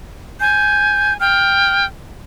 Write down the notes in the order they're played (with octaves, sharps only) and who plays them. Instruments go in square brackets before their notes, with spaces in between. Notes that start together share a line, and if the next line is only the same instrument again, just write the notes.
[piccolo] G#5 [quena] G6
[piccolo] G5 [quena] F6